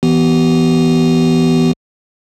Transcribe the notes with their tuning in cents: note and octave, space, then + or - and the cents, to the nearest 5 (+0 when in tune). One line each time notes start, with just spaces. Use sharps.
E3 +0 B3 -5 G4 -40